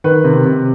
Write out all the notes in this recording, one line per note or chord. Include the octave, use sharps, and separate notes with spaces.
D#3 B4
C3
C3